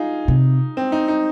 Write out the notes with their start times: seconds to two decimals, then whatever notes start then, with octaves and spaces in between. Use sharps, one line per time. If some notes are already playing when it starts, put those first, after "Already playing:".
Already playing: D#4 F4 G#4
0.28 C3
0.77 C4
0.92 D#4
1.08 D#4